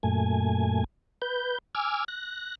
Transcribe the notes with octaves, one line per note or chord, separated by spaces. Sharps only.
F#2 A#2 A3 G#5
B4 G6
G#5 D6 E6 F6
F#6 A#6